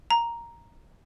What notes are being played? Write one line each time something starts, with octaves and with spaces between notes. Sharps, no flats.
A#5